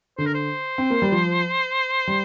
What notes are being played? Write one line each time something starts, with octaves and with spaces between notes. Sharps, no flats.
D3 C5
A#4
C5
C4
A#3
G3
F3
G3